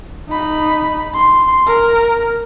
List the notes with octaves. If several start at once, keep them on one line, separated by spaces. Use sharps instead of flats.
D#4 B5
C6
A#4